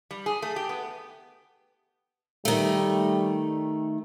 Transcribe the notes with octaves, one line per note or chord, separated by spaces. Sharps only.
G3
G#4
A3
G4
B3
D#3 G3 A3